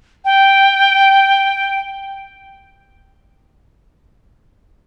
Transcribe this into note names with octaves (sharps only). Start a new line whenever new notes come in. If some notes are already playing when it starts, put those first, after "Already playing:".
G5